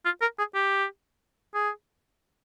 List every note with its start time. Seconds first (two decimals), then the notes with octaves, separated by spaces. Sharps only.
0.06 F4
0.22 A#4
0.39 G#4
0.55 G4
1.55 G#4